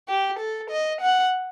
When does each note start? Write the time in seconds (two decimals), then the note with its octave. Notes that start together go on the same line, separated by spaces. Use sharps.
0.09 G4
0.39 A4
0.71 D#5
1.01 F#5